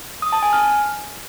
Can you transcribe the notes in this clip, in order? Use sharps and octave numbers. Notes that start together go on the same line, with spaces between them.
D#6
A5
G#5
F6